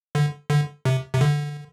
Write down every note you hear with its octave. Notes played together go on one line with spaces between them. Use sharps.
D3
D3
C3
C3
D3